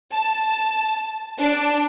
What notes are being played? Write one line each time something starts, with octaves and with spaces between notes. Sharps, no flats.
A5
D4